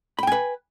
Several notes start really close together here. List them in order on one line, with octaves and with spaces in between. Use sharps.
B5 G5 G#5 B4